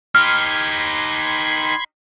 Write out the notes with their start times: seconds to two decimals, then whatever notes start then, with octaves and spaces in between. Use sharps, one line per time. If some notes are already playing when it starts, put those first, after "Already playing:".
0.15 D#4 G4 B5 C6 F6 G#6